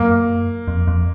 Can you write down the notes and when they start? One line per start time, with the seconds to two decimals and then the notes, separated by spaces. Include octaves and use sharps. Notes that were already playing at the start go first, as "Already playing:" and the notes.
Already playing: F#2 A#3
0.68 F2
0.87 F2